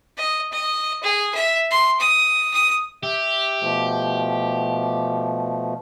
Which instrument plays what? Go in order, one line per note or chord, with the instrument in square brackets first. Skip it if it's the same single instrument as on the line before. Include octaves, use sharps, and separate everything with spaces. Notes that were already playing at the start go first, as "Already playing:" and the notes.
[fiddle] D#5
D#5
G#4
E5
C6
D#6
D#6
[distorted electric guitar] G4 [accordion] E5
[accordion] B2 F3 A3